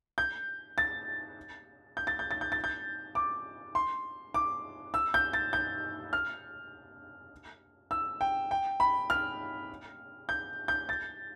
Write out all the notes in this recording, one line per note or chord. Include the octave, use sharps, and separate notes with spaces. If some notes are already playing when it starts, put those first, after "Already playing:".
G6
A6
G6
A6
G6
A6
G6
A6
G6
D6
C6
D6
E6
G6
A6
G6
F6
E6
G5
G5
B5
F6
G6
G6
A6